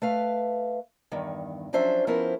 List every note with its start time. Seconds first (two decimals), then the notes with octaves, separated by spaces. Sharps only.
0.02 A3 B4 F5
1.12 E2 G2 D#3
1.73 F3 F#3 C#4 D4 C5 E5
2.07 F3 B3 C#4 E4 A#4 C5